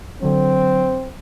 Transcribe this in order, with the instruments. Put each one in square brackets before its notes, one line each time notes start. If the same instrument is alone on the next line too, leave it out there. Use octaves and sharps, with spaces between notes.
[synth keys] D3 F#3 [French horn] C4